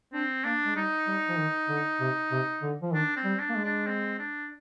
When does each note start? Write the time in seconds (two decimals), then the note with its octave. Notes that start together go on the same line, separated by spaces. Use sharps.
0.13 C4 D4
0.44 A#3 D4
0.66 G#3
0.76 G3 D#4
1.07 G3
1.29 F3
1.38 D#3
1.69 D3
2.00 C3
2.31 C3
2.62 D3
2.82 F3
2.94 D#3 D4
3.17 C4
3.25 G3
3.40 D4
3.49 A#3
3.56 G#3
3.64 D4
3.87 C4
4.19 D4